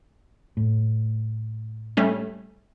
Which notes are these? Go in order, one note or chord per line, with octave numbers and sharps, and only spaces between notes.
A2
G3 A3 C#4